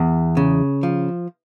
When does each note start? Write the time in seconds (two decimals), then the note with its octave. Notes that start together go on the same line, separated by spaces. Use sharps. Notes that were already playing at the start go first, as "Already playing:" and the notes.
Already playing: E2
0.37 C#3
0.83 F3